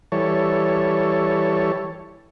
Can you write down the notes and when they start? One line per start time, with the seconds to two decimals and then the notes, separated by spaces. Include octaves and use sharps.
0.12 E3 G3 A4 C#5